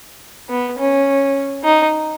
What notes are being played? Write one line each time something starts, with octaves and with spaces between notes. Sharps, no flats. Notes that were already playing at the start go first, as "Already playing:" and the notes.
B3
C#4
D#4